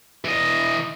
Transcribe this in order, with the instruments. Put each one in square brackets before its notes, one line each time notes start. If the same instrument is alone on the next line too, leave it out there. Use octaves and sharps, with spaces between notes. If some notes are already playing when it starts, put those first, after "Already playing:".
[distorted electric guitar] E3 D#5